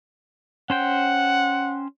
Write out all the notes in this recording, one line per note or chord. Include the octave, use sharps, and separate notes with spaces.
C#4 C5 F#5 G5